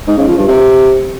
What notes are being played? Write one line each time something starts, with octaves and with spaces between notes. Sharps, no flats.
G#2
C#3
F3
G2
C3